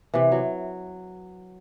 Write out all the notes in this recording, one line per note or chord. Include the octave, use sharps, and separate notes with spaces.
C3 E3
F#3